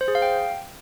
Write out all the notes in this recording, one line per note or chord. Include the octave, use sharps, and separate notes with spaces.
C5
G#4
F5
G5